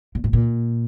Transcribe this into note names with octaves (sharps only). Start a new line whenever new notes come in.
A#2
A2
A#2